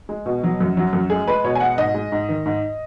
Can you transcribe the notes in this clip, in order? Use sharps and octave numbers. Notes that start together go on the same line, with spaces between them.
G#3
B2
F#3
F#2
F#3
F#2
G#3 G#4
G#3 B4
B2 C#5
G#5
G#3 F#5
G#2 D#5
G#3
G#2
D#3
G#2